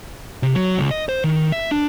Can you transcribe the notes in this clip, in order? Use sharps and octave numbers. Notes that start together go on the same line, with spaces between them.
C3
F#3
C#2
D#5
C5
D#3
E5
D4